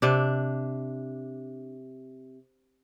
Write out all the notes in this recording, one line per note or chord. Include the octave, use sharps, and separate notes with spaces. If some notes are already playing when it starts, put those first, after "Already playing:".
C3 D4